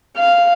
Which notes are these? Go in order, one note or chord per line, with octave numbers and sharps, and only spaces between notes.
F5